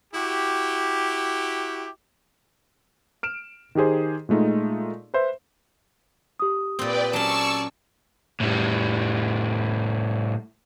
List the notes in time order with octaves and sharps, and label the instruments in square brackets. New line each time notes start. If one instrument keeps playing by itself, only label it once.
[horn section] E4 F#4 G4
[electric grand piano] F6 D7 E7
D#3 D#4 G4 G#4 C5
A#2 G#3 A3 D#4 F4
B4 C5 E5
[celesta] G4 D#6
[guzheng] A#2 C4 [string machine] B4 D5 G5
[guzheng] F#3 C#4 [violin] D5 A5 [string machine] C#6 E6
[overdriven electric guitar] A2 G3